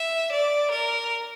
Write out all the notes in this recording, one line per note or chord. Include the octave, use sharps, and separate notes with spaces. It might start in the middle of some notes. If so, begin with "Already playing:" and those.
Already playing: E5
D5
A#4